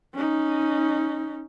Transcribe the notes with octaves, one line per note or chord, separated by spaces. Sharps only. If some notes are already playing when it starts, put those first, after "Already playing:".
C#4 D#4